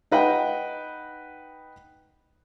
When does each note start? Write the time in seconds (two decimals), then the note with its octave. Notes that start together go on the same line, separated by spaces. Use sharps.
0.12 D#4 B4 F#5 G5